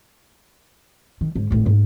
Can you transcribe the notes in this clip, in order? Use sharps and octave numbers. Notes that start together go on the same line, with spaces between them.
D#3
G#2 D3
G#1 A2
G#2 A#3